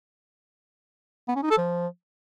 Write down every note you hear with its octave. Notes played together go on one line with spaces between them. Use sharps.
B3
C#4
D#4
A4
F3